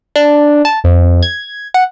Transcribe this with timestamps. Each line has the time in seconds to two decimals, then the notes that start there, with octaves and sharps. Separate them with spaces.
0.16 D4
0.65 A5
0.84 F2
1.23 G#6
1.74 F#5